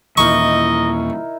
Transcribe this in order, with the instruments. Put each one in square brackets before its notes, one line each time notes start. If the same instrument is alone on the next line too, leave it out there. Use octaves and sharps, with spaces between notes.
[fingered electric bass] D#2 A#2 E3 [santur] D#4 E4 A#4 [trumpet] D#5 [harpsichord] C#6